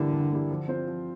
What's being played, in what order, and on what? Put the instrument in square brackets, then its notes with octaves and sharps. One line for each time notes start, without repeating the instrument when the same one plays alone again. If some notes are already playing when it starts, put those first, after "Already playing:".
Already playing: [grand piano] G2 E3 A#3 E4 G4 [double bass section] D3
[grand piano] G2
E3 A#3 E4 G4
F3
C4 F4 C5
F3